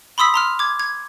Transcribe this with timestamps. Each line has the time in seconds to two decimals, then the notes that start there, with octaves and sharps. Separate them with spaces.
0.18 B5 C6 D#6 E6 B6
0.34 A#5 C6 F6
0.59 D6 G#6
0.80 G#6